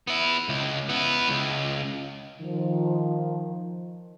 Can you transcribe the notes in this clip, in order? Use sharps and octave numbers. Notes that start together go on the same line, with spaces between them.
B3 E4
C#2
B3 E4
C#2
D#3 F3